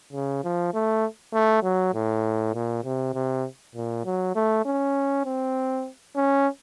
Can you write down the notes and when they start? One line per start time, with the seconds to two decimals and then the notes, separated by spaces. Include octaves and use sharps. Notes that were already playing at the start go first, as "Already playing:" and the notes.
0.13 C#3
0.44 F3
0.74 A3
1.34 A3
1.63 F#3
1.94 A2
2.54 A#2
2.84 C3
3.14 C3
3.75 A#2
4.05 F#3
4.35 A3
4.65 C#4
5.25 C4
6.16 C#4